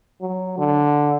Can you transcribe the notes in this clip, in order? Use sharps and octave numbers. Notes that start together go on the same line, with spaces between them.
F#3
D3